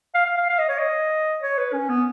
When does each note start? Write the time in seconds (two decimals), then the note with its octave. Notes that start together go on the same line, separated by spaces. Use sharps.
0.15 F5
0.26 F5
0.38 F5
0.50 F5
0.59 D#5
0.69 C#5
0.78 D#5
1.42 C#5
1.58 B4
1.73 C#4
1.89 B3